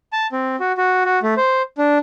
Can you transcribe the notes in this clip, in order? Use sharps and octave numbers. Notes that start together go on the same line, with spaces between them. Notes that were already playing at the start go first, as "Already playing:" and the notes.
A5
C4
F#4
F#4
F#4
A3
C5
D4